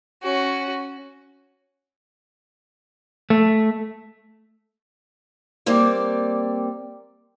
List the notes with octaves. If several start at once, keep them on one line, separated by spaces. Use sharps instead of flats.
C#4 F#4
A3
G3 A#3 C4 D5